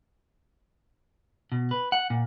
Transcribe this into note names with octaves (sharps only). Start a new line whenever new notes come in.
B2
B4
F#5
A#2